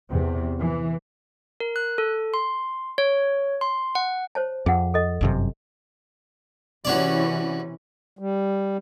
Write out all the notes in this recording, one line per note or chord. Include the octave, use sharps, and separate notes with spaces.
E2 C3
E3
A#4
F#6
A4
C6
C#5
C6
F#5
C5 C#5 A5
F2 G#4 F#5
A4 D#5
G1 F#2 C3
C3 E3 C#4 F#4 C#5 D5
G3